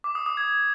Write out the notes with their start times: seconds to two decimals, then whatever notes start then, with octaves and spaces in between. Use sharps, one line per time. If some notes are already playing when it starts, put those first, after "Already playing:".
0.04 D6
0.15 D#6
0.26 D#6
0.37 G#6